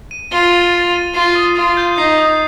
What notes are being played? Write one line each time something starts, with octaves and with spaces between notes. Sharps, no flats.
D#7
F4 G7
A6
A6
D#7
F4 C7
D#6
F4 D#6
G6
D#4 C7
D#6